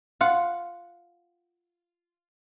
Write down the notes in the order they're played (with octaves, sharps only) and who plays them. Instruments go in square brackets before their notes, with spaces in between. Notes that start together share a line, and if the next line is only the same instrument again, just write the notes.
[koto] F4 F5 F#5